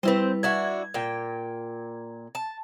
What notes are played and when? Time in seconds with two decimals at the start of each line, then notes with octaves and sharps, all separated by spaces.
0.03 G3 C4 C#4 E4 B4 C5
0.43 D4 E4 F#4 G#6
0.94 A#2 G5
2.35 A5